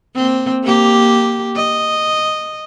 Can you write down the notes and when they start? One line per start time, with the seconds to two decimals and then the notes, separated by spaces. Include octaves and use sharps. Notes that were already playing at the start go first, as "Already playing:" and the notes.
0.15 A#3 C4
0.64 A#3 G4
1.56 D#5